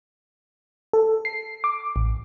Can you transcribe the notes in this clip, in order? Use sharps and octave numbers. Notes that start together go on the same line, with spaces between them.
A4
C7
D6
A1